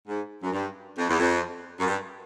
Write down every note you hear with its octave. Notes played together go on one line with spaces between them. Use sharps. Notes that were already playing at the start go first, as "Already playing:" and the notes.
G#2
F#2
G2
F2
E2
F2
F#2
G2